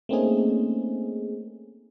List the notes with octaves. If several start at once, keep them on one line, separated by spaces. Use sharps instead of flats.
A3 A#3 C4 C#4 D#4 G#4